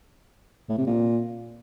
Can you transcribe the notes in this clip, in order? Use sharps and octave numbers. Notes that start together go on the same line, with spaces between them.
A2
C3
A#2